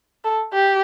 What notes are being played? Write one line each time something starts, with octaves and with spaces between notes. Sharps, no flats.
A4
G4